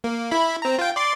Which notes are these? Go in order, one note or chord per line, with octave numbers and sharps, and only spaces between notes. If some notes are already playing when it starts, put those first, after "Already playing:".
A#3
E4 B5
C4 A#5
F4 G5
D5 C6 D6